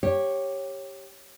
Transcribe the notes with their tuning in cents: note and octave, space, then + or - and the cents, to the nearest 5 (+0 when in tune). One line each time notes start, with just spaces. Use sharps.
G4 +0 C#5 -15